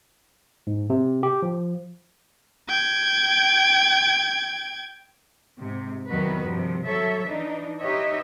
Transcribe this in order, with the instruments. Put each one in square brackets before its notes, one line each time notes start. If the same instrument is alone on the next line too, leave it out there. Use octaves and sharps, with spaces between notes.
[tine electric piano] G#2
C3
G4
F3
[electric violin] G5 G#6
[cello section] G#2 C3
E2 C3 D#3 F#3 F#4 B4
G2 C3 F3
F#3 A4 C#5 E5
E3 D4 D#4
D#4 G4 B4 C#5 D#5 E5